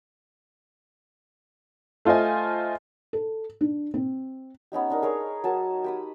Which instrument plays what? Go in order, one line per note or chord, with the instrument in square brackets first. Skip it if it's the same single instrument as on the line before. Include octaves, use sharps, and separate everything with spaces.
[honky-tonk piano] A3 F4 C5 D#5 G#5
[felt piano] A4
D4
C4
[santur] B3 C#4 D#4 G4
D4 D#4 A#4
G#4 A#4 C#5
F#3 A#4 A5
G4 B5 D#6